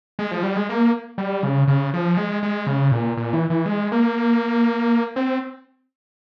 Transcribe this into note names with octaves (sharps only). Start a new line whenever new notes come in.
G#3
F3
G3
G#3
A#3
G3
C#3
C#3
F3
G#3
G#3
C#3
A#2
A#2
E3
E3
G#3
A#3
C4